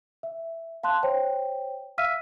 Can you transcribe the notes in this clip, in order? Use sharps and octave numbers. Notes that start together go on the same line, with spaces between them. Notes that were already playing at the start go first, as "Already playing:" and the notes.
E5
F5 A5 C6 F#6
C5 C#5 G5
E5 F5 E6 F6 B6 D#7